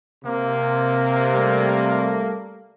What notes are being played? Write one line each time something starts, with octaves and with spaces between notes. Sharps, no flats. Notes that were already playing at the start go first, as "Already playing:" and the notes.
C3 A#3
G3 A3